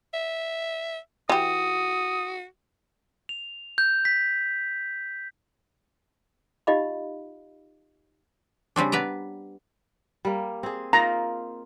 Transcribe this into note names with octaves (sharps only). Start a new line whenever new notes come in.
E5
E3 F#4 G4 D#6
F7
G6
B6
D#4 F4 G4 D#5 F5 B5
C#3 G3 C4 D4
B3 B4 D5 A#5
G3 A#3
C4 G#4
A#3 D#4 F4 A#5